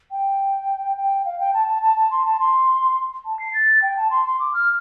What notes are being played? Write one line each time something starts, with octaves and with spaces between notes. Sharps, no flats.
G5
G5
F5
G5
A5
A5
A5
A5
C6
A5
C6
A5
C7
A6
G5
A5
C6
C6
D6
F6